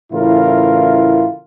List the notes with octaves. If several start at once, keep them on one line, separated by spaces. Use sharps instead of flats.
A2 C#3 E3 E4 F4 A#4